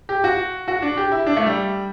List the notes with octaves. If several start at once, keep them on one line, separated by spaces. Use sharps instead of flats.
G4
F#4
F#4
D4
G4
E4
D4
A3
G3